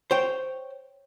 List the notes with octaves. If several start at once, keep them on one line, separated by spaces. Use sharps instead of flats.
C5 C#5 G5